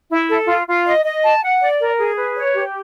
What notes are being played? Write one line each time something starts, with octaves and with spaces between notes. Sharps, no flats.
E4
A4
F4
F4
D#5
D#5
A5
F#5
D5
A#4
G#4
B4
C#5
G4